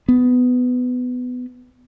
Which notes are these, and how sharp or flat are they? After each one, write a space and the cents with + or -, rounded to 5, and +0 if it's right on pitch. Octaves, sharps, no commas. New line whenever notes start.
B3 +15